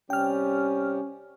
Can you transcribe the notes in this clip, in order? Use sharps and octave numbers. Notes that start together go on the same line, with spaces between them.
C3 G3 C#4 G4 G5 F6